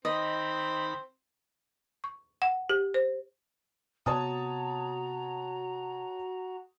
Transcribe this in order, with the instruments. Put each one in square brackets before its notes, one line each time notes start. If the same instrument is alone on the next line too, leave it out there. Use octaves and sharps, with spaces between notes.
[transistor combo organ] D#3 B5 [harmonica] C4 [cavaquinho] D#5
[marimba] C#6
F#5
G4
C5
[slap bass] C3 B3 [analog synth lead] F#4 [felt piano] C#5 A5 D#6 [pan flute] A#5